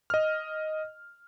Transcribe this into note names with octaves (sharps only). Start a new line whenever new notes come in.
D#5 F6